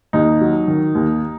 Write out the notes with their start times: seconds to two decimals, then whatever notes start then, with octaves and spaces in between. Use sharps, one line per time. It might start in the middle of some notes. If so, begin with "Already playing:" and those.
0.13 D#2 D#4
0.41 F#3
0.68 D#3
0.95 D#2